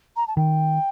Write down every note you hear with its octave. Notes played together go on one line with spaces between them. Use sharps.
A#5
A5
D#3 G5